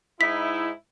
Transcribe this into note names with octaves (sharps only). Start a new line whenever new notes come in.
G#2 D#4 E4 B6